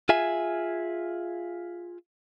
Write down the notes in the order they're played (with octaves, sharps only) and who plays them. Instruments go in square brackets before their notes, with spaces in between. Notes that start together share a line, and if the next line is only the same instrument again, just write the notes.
[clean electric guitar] F4 G#4 E5 G#5